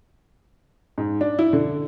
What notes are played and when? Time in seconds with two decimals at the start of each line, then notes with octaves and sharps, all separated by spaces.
0.98 G#2
1.21 D4
1.39 E4
1.53 D3